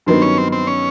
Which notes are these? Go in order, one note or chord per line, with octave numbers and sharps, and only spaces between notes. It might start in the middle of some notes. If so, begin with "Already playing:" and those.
G2 D#3 F#3 B3 C4
C#4
C4
C4
C#4